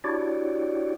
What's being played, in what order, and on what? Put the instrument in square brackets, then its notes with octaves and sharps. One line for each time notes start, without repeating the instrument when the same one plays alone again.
[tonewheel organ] D4 E4 F#4 G4 C#5 D5